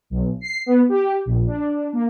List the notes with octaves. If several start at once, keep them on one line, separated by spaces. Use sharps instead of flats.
B1
C7
B3
G4
A#1
D4
A#3